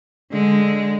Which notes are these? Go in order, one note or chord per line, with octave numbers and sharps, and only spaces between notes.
D3 G#3